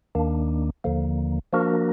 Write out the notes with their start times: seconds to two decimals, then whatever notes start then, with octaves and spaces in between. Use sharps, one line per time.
0.15 D#2 D#3 A#3 D4
0.84 D#2 D3 F3 A#3
1.53 F3 A#3 D4 F#4 A#4